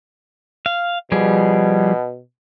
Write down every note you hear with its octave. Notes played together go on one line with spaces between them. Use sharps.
F5
B2 F3 G3 G#4